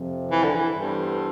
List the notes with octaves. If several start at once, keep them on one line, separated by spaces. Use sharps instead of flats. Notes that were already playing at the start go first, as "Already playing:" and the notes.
Already playing: F2 C3 F3
E3
D3
E3
G2 E3 B3 D4 A4 C5